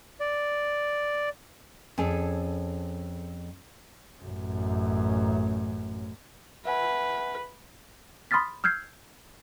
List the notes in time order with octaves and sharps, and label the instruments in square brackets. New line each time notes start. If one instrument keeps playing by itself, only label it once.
[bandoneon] D5
[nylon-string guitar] F2 C#4 G#4 A4
[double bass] A1 F#2
[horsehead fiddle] B4 [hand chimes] E5 F#5 G#5
[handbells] B5 C6 D#6 F6 A6 B6
E6 F6 G6 G#6 C7